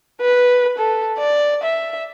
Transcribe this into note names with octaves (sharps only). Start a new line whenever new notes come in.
B4
A4
D5
E5